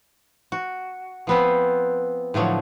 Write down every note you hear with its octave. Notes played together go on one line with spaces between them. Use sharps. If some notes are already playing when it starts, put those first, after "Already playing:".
F#4
F3 B3 C4
A2 D3 F3 F#3